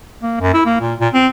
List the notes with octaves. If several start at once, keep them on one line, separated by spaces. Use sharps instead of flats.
A#3
F#2
E4
A#3
A#2
A#2
C4